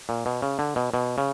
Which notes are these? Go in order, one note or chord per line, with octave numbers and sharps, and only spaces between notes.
A#2
B2
C#3
D3
B2
B2
C#3